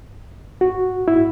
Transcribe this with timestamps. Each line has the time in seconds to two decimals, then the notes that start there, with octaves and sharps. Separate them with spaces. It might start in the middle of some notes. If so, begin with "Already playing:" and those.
0.61 F#4
1.08 E4